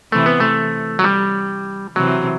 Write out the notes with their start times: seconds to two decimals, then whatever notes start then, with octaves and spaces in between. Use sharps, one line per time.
0.12 C3 E3 A3
0.26 B3
0.40 A3
0.99 F#3
1.04 G3
1.96 C3 E3 F#3